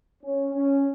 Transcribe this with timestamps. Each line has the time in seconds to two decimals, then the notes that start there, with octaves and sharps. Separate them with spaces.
0.24 C#4
0.54 C#4